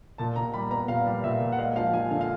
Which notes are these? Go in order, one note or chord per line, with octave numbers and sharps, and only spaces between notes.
A#2 A5
A#2 A#5
G3 B5
B3 A#5
A#2 F5
G3
A#2 E5
A#2
F#5
G#3 F5
F3 F5
F3 G#5
D3 F5
F5